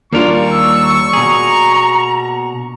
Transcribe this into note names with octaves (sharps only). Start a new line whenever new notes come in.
D#2 G3 A#3 D4 F4 A#4 C#6
E6
B2 G#4 A#5